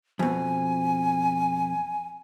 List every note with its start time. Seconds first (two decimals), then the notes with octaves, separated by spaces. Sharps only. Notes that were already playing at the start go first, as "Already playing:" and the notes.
0.19 F2 B2 G#5